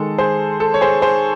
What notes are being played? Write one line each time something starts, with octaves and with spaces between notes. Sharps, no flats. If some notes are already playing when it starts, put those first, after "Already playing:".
Already playing: D#3 G#3 A4
G#4 C5
A4
C#5
G#4 C5
G#4 C5